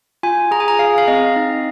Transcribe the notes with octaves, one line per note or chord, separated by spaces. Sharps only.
F4 G#5
G#4 A#5
G#5
A#5
G#4 F5
F5
C4 D#5
D#4